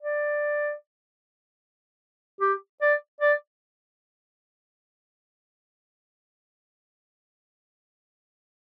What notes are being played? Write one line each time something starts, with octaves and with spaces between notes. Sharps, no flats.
D5
G4
D5
D5